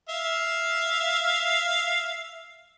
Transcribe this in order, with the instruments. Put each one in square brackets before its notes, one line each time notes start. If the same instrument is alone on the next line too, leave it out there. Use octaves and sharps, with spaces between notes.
[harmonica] E5 F5